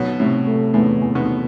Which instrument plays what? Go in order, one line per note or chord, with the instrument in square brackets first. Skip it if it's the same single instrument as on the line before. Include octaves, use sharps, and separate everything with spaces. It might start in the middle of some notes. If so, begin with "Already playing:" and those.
Already playing: [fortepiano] B2 [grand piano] F#3
[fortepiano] A2 [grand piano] C3
[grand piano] A3
[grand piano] E2 [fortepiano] A2
[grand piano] E2
[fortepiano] B2